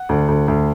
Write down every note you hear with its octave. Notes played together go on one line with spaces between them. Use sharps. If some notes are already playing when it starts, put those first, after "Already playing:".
Already playing: F#5
D2
D2
D2